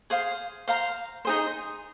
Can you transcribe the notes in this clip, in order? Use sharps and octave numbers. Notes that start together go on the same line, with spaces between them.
G#4 C5 F5
C5 F5 A#5
D#4 G#4 C5